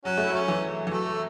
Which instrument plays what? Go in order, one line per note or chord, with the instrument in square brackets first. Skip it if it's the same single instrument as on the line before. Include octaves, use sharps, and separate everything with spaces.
[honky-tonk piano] F#3 [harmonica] C#4 F#4
[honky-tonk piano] A3
[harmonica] E4
[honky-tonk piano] F#3 [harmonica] C#4
[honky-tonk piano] E3
E3
[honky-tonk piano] F#3 [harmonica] A3